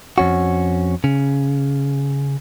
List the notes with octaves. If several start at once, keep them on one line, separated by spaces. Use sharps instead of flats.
F2 C#4 F#4
C#3